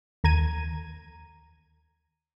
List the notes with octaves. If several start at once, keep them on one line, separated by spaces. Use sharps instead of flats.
D#2 A#5 G#6 D#7